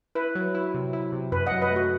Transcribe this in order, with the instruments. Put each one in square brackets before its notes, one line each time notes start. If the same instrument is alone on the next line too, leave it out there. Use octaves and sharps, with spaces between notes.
[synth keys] E4 [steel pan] B4
[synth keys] F#3
E4
C3
E4
C3
[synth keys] F#2 [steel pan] B4
[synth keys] F#3 [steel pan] D#5 F#5
[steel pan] B4 D#5
[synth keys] A3 [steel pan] F#4